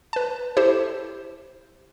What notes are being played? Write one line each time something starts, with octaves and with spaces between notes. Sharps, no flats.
B4 A5
E4 G4 A4 C5